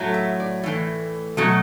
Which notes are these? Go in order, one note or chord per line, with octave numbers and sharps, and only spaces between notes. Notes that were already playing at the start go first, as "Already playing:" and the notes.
Already playing: A2 F#3 A3
E5
D5
A2 E3 A3
B2 F#3 A3